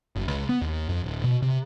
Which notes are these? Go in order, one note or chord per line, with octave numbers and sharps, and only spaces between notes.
F#1
C#2
B3
D#2
F2
D1
B2
C3